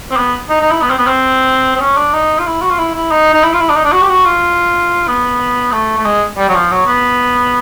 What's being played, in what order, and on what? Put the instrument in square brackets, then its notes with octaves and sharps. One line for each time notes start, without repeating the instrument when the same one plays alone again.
[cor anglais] C4
B3
D#4
D#4
E4
B3
C4
B3
C4
C4
C#4
D4
D#4
F4
E4
F#4
F4
E4
E4
D#4
D#4
E4
F4
E4
D4
D#4
D4
F#4
G4
F#4
F4
B3
A3
A3
G#3
G3
F#3
F3
F#3
B3